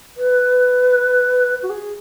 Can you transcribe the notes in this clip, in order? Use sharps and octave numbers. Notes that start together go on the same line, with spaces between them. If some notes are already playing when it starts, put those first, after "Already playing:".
B4
F#4
G#4